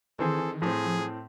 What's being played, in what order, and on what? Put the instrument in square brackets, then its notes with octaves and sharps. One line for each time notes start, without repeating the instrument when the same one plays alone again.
[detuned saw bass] D#3 [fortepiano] E3 C4 G#4 [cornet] A4
[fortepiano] A2 C4 [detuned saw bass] F3 [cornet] G#4